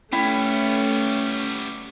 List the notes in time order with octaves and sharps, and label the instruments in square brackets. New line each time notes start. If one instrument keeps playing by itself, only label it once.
[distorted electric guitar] G3 B3 [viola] A3 [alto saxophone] C#4 [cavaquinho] E4 G5